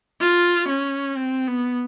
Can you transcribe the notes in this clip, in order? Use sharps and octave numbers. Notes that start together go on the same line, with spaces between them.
F4
C#4
C4
B3